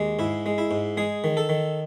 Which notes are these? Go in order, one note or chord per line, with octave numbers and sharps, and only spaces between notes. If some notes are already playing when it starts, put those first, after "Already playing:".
Already playing: D#2 G#3
G#2 E4
G#3
E4
G#2
G#3 G#4
D#3
A4
D#3